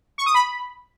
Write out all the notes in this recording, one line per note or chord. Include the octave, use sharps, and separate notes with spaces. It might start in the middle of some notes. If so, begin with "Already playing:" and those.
C#6
D#6
B5